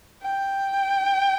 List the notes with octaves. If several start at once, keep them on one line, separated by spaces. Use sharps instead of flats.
G5